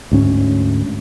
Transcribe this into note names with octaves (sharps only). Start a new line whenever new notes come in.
D2 G#2 C#4